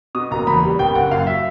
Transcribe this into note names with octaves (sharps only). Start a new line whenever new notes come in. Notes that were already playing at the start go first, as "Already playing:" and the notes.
B2 D#6
F#1 A#5
E2 B5
G3
F#1 G5
F#1 F#5
F#2 F5
E5